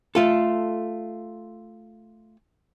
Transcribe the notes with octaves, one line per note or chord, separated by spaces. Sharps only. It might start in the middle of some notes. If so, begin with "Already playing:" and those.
A3 F4 A4